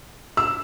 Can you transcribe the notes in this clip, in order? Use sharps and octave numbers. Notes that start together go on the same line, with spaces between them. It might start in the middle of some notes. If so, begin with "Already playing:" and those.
E6